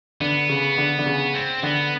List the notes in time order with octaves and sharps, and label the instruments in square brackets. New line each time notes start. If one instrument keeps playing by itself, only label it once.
[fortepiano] D3 [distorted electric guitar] B3
[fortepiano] C#3
D3
D3
C#3
[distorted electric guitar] C4
[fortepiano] D3 [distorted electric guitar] B3